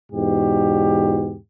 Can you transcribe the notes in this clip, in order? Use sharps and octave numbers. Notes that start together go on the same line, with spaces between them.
E2 G#2 B2 G4